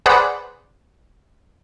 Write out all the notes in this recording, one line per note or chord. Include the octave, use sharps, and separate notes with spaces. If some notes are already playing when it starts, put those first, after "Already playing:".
G#4 B4 C5 D5 F#5